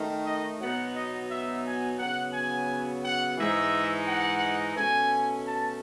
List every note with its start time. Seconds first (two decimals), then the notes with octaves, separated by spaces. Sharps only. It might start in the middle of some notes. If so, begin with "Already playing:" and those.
Already playing: D#3 A3 D#4
0.26 D#5
0.60 B2 F#3 B3 D#4 F#5
0.95 D#5
1.30 E5
1.64 G#5
1.98 C#3 F#3 B3 F#5
2.33 G#5
3.03 F#5
3.38 G#2 E3 G#3 D#4 E5
4.07 F#5
4.76 B2 A3 C#4 G#5
5.45 A5